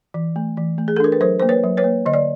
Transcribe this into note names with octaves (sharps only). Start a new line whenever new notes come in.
E3
A3
E3
A3
G#4
A4
D4 A#4
B4
F#3 A#4 C5
A#3 C5
B4 C#5
F#3
B4 C#5
A#3
D3 D#5
D5